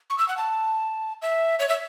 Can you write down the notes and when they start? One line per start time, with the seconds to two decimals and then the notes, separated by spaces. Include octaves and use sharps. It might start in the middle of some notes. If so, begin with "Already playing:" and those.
0.10 C#6
0.18 E6
0.29 F#5
0.37 A5
1.22 E5
1.59 C#5
1.69 E5